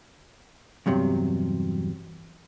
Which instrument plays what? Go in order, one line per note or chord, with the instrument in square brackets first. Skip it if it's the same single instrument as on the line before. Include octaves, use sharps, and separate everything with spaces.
[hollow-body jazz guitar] E2 G2 C3 F#3